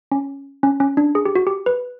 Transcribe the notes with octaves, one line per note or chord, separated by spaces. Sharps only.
C#4
C#4
C#4
D4
G#4
G4
F#4
G4
B4